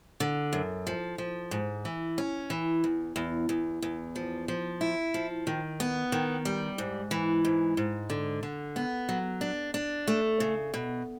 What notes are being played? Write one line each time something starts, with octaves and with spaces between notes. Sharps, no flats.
D3
F#2
F3
F3
G#2
E3
C#4
E3
E2
E2
E2
E2
F3
F3
E4
F3
D#3
B3
D#3
G3
G#2
E3
G#2
G#2
D3
D3
B3
F#3
D4
D4
A3
C#3
B2